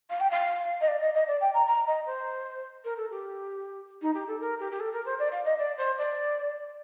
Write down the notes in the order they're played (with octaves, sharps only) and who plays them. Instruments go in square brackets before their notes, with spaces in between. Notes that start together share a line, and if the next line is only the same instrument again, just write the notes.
[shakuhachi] F5
G5
F5
D#5
D5
D#5
D#5
D5
G5
A#5
A#5
D#5
C5
A#4
A4
G4
D#4
G4
A4
A#4
G4
G4
A4
A#4
C5
D5
F5
D#5
D5
C5
D5